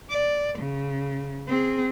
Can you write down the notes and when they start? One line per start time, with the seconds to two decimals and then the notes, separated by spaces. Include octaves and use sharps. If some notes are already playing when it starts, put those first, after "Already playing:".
0.10 D5
0.59 C#3
1.48 C4 G#4